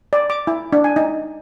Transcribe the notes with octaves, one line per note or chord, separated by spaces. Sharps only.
D5
D6
E4
D4
G#5
D#4